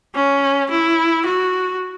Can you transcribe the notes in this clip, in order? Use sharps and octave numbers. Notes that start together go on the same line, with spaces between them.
C#4
E4
F#4